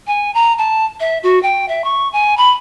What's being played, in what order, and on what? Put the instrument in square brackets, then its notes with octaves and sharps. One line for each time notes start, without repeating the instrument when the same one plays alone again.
[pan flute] G#5
A#5
A5
E5
F#4
G5
E5
C#6
G#5
B5